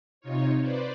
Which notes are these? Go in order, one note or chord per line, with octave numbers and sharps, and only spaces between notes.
C3 D#4 F4 C#5
B4 C5 D5